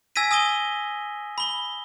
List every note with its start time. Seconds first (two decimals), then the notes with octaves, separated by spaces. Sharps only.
0.16 G#5 E6 G#6 A#6 B6 D#7
0.31 G#5 D#6 A#6 D#7 G7
1.38 B5 G7